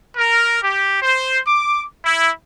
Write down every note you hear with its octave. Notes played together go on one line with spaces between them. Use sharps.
A#4
G4
C5
D6
E4